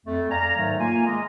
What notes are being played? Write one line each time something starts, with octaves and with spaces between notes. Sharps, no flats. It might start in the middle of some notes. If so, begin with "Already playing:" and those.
F2 A3
D5 F5 G#5 A#5
G#2 D#3 F#3 A3
A#3 F4 G#5
G#3 D#5